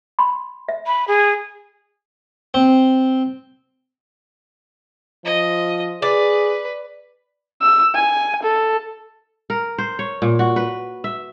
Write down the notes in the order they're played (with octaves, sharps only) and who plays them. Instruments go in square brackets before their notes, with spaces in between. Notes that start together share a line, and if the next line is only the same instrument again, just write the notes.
[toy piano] B5 C6
E5
[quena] B5
G#4
[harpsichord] C4
[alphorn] F3 [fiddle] D#5
[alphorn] G#4 [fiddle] B4 [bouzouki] D5
[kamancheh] E6
G#5
A4
[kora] A#4
C5
C#5
A#2
F#4
B4
E5